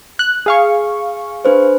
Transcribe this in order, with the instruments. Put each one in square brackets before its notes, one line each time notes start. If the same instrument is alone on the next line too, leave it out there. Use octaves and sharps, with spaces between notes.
[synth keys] F#6
G#4 F5 C#6
[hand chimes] D4 B4 C5